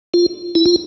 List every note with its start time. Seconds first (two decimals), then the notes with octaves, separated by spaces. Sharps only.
0.14 F4
0.55 E4
0.66 F4